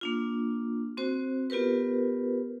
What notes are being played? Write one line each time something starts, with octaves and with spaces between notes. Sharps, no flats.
A#3 D4 F4
C4 F#4 C5
B3 F4 G4 A#4 B4